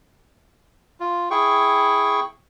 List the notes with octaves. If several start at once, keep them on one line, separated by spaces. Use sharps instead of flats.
F4
E4 G#4 G5 C#6